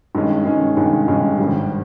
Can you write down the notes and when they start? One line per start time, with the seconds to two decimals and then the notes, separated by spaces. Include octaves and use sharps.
0.15 G2 D#3 G#3 C#4
0.45 G2 D#3 G#3 C#4
0.76 G2 D#3 G#3 C#4
1.08 G2 D#3 G#3 C#4
1.38 G#1 G2 G3